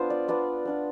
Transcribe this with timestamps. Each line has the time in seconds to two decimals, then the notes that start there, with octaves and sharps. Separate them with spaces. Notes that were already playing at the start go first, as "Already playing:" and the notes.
Already playing: B3 D4 F4 C5
0.10 D5
0.28 B3 D4 F4 D5
0.65 B3 D4 F4